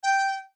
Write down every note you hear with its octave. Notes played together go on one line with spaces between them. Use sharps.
G5